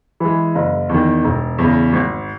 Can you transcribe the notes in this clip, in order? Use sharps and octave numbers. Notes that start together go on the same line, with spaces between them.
E3 G#3
F#1
E2 D#3
E1
E2 C#3
G#1